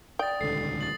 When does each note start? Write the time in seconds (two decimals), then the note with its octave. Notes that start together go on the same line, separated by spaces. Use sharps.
0.19 D5 G5 D#6 A6
0.41 D#1 C#2 D3 A4 C7
0.81 A6 F#7